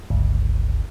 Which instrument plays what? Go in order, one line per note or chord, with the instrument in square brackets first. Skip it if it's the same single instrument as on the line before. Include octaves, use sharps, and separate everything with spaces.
[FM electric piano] G1 C#2